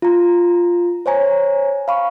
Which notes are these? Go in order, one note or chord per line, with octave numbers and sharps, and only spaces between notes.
F4 A#5
C5 C#5 G#5 A#5
F5 B5 C#6